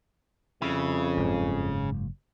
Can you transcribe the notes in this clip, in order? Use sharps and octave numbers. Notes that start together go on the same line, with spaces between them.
F2 C#3 G3 E4
F#1 C#2 G#2